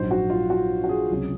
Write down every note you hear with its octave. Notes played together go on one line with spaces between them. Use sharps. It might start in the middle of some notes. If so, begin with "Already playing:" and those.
Already playing: A#1 G#2 F#3 C5
F#4
F4
F#4
F#4
G#4
C#2 C3 F#3 C#4